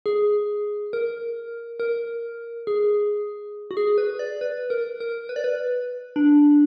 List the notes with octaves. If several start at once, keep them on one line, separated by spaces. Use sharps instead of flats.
G#4
A#4
A#4
G#4
F#4
G#4
B4
D5
B4
A#4
A#4
B4
D5
B4
D4